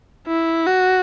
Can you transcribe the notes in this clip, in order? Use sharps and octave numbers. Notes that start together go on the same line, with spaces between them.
E4
F#4